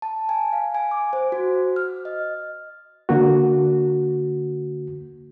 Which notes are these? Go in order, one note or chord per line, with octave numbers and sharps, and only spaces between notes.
A5
G#5
F5
G#5
D6
C5
F#4
F6
D#5
D3 A#3 F#4